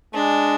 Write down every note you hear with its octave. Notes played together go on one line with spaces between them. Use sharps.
G#3 D4